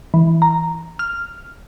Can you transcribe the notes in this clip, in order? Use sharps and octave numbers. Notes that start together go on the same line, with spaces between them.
E3
A#5
F6